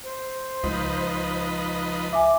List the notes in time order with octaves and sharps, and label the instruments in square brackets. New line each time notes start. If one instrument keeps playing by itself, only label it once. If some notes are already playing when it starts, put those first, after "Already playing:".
[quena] C5
[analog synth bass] C#2 [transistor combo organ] F3 D#4 B4
[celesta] E5 G#5 [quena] D6